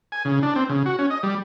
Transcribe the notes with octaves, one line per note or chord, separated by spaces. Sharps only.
G#5
C#3
D4
C4
C#3
F#4
C#4
D#5
G3